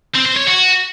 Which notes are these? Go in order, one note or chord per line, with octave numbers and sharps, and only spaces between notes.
C4
C5
C#5
F#4